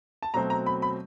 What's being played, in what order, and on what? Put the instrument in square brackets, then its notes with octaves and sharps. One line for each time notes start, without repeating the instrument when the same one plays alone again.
[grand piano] A5
B2 F#3 A3 C4 A#5
A#5
B5
B5